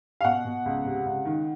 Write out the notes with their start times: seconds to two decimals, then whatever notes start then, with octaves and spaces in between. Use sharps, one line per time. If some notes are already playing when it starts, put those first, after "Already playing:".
0.21 F5
0.24 B2 F#5
0.45 B2
0.65 C#2
0.85 C3
1.05 C#2
1.25 D#3